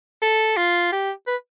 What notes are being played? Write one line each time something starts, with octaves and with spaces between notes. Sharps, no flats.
A4
F4
G4
B4